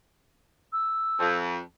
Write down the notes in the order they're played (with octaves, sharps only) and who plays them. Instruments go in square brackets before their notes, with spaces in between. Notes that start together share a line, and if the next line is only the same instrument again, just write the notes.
[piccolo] E6
[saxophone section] F2